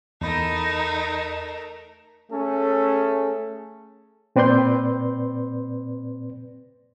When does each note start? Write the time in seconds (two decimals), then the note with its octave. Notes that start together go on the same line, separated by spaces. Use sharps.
0.21 E2 A3 D#4 A#4 B5
2.31 A3 C#4 G#4 A4
4.36 A#2 C4 B4 D5 C6 G6